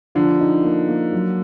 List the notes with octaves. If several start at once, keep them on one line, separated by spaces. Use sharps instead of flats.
D3 F3
D#4
A#3
A#3
F#3